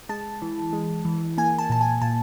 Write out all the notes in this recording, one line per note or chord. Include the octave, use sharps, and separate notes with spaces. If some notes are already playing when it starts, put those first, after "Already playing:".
G#3 A5
E3
G#3
E3
A#3 G#5
A5
A#2 A5
G#5
A#2 A5